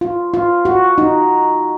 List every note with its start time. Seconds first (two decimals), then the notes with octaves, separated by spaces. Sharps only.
0.01 F4
0.34 F4
0.65 F#4
0.98 D#4